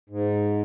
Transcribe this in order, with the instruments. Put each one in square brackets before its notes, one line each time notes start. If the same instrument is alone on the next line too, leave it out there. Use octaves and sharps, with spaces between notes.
[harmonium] G#2